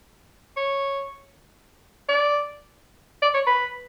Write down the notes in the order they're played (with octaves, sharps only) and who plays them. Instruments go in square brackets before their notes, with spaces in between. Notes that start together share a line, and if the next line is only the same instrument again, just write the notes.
[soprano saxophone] C#5
D5
D5
C#5
B4